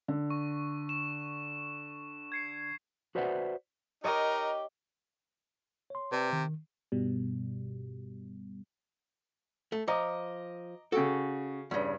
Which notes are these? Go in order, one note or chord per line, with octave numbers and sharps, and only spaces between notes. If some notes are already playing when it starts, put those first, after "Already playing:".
D3
C#6
E7
G#6 C7 C#7
F#4 B4 C5 D5 E5 F#5
D#4 G4 A#4 C#5 D#5 D6
C#5 C6
C3 B4 D5 A5
D#3
G2 B2 G3
A3
F3 D#5 A#5 D6
C#3 F#4 A4 G5
E2 G2 C#3